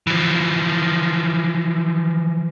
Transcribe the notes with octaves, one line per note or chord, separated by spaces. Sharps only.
E3 F3